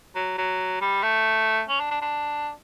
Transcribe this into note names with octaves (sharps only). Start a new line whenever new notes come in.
F#3
F#3
G3
A3
C#4
D4
D4
D4